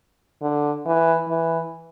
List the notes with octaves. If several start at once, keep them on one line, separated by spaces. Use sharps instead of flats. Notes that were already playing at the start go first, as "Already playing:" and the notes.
D3
E3
E3